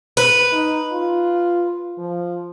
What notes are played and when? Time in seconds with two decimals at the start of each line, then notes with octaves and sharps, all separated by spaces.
0.17 B4
0.52 D#4
0.92 F4
1.98 F3